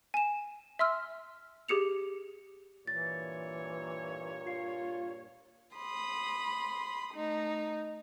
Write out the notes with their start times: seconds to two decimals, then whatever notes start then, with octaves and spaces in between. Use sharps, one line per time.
0.14 G#5 E7
0.79 E5 C6 E6 F6
1.69 G4 G#4 C#7 F7
2.87 G2 A#2 E3 C#5 A6
4.47 F4 C7
5.75 B5 C6 D#6
7.13 A3 D#4